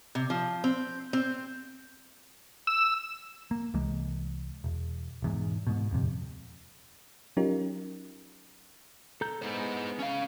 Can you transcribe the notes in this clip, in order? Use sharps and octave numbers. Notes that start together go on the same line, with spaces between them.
C3
F3
C4
C4
E6
A#3
C2 E3 G#3 A#3
E1
E1 E2 G#2
G#2 B2
D#1 F2 C3
F#3 C#4 D#4 F4 G4 A#4
A4 A#5 G6
G#3 B3 D#4 E4 C5
C#4 F5